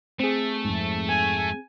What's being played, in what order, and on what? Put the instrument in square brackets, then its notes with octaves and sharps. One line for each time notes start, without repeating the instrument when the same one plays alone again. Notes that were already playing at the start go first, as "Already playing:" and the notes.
[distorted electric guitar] A3 [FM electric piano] C4 G#4
[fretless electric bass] F2 G#2
[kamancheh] G#5